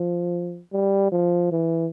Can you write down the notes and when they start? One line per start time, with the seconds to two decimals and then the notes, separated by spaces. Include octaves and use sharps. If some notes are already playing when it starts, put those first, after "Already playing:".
Already playing: F3
0.73 G3
1.12 F3
1.52 E3